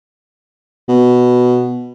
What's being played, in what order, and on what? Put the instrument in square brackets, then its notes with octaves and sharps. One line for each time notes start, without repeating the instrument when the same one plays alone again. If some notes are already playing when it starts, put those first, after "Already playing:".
[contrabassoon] B2